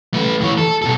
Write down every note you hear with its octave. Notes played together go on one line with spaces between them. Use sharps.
A3 B4
E3 C#5
A4
B2 A4